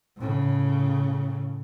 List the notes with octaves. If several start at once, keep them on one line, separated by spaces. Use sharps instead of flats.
A2 C#3